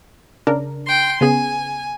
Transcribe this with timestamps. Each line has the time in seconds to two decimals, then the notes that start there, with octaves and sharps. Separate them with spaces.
0.47 C#3 D4 A#4
0.85 G5 C6
1.21 C#3 B3 G#4 G#5